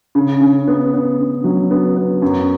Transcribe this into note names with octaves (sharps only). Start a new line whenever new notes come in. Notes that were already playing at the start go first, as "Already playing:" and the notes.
C#3
C#3
B3
B3
C#3
F#3
B3
B3
F#2